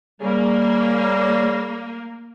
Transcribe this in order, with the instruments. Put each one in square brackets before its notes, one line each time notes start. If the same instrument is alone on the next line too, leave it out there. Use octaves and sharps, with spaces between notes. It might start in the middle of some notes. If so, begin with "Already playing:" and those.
[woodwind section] C#3 G3 [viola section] A#3